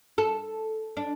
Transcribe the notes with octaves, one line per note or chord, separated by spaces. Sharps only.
A4
D4